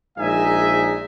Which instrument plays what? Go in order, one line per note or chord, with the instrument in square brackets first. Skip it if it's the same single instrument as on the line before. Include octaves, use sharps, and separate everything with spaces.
[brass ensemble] A#1 G#3 D#4 D#5 E5 G#5